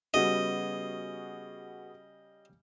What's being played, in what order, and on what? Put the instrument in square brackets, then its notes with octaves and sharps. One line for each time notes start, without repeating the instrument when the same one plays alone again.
[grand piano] C#3 G3 [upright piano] B3 F#4 G#4 [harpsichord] D#5